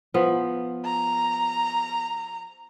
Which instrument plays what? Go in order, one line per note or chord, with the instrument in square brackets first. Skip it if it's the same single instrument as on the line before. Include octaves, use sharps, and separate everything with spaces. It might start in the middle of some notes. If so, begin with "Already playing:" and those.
[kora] F3 B3
[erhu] A#5